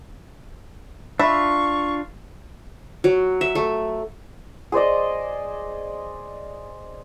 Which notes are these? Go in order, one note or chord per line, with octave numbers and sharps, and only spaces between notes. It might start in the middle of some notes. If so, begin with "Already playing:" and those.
D4 F4 E5 B5 C#6
F#3
E5
A3
G#4 C5 D5 D#5